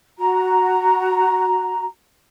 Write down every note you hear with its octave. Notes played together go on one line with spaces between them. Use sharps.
F#4 A#5